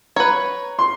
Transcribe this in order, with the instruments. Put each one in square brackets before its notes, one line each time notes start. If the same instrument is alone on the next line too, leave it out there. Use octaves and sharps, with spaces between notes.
[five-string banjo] B4 C#5 [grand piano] A#5
[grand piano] C6